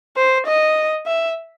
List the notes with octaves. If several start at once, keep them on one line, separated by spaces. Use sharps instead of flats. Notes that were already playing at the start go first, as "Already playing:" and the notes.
C5
D#5
E5